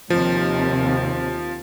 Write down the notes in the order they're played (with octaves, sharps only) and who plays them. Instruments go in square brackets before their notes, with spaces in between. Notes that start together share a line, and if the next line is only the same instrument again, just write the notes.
[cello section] D#2 C3 [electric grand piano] F3